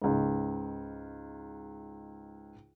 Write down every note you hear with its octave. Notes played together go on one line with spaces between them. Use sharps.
C#2 G#2